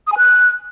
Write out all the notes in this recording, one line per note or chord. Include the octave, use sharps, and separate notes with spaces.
D#6
G#5
F#6